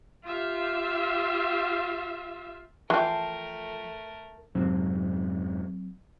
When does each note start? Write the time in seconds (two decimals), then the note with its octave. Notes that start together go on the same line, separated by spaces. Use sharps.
0.24 F4 G4 E5 F5
2.90 E3 F3 A3 A#4 G5 A5 C6
4.55 F2 G#2 C3 F#3 C4